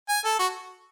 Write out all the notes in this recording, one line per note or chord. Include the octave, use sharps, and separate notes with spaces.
G#5
A4
F#4